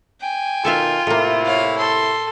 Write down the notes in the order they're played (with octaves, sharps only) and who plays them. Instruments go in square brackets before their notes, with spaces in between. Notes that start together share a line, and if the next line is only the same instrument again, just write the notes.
[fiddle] G5 G#5
[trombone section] B2 D#3 [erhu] F4 [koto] A4 E5 F5
[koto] A2 A#3 [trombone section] C3 A3 E4
[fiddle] C#5 F5
[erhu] A4 [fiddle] C6